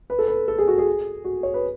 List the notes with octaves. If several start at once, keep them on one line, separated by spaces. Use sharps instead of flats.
B4
A4
B4
A4
G#4
F#4
G#4
F#4
C#5
B4